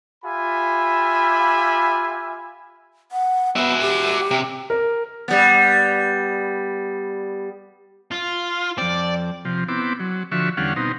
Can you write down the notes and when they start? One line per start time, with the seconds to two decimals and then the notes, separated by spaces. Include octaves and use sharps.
0.24 F4 G4 E5 G#5 B5
3.12 F#5
3.56 B3 F#4 E5
3.81 G4
4.31 C3
4.70 A#4
5.28 G3 B3
8.11 F4
8.78 F2 C4 D5
9.45 C3 F3
9.69 B3 C4 E4 D6
10.00 F#3
10.32 D3 F3 F#4 E5 C#6
10.57 E2 D3 G3 C#4 F5 F#5
10.76 B2 C4 D#4